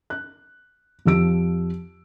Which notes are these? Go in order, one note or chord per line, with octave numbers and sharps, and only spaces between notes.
F#6
F2 F3 G4 E6 D7